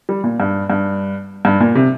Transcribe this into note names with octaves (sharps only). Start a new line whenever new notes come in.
G3
A#2
G2
G2
G2
A#2
C3